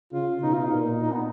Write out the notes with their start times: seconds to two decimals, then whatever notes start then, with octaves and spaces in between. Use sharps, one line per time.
0.12 C#3 F4
0.43 B2 D#4
0.54 F4
0.64 D#4
0.72 A#2
1.02 D#4
1.12 B3